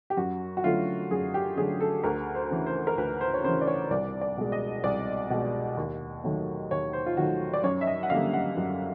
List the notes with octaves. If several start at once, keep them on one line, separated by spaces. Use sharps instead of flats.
G4
F#2 F#4
F#4
D3 F#3 A3 F4
F#2 G#4
G4
D3 F#3 A3 G#4
A4
D2 A#4
C5
C#3 E3
C5
A#4
D2 B4
C5
C#5
C#3 E3 C5
D5
C#5
C2 D5
D5
B2 G#3
D#5
C2 D5
B2 G#3
D#2
D#3 F#3 A3
D#2 C#5
C5
F4
D#3 F#3 A3 F#4
D5
F#2 C#5
E5
D#5
F#5
D3 G3 A#3 F5
F#5
F#2